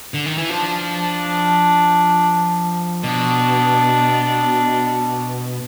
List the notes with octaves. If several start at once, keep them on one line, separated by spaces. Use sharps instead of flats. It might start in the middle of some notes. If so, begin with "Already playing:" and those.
D3
D#3
E3
F3 D4
B2 D4